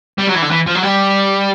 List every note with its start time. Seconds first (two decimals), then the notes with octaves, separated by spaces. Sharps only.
0.18 G3
0.27 F#3
0.35 E3
0.42 D3
0.51 E3
0.66 F3
0.75 F#3
0.83 G3